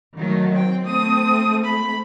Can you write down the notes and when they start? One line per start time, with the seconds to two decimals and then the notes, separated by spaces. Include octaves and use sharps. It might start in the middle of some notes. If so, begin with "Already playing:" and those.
0.18 D#3 F#3 A3
0.55 C4 G5
0.86 A3 D#6
1.64 B5